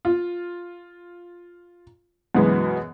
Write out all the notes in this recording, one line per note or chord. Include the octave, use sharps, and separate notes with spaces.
F4
F#2 B2 E3 G#3 B3